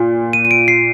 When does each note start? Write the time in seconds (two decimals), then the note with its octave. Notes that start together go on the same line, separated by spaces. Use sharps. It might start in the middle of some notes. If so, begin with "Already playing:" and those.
Already playing: A#2
0.33 D#7
0.45 D#7
0.51 D7
0.68 C7